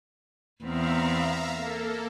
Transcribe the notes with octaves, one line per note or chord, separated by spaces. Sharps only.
E2 B3 C4 E5 F5 A#5
A#3 A4